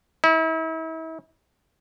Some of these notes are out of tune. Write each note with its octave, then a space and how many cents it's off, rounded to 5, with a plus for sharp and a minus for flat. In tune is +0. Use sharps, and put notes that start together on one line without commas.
E4 -40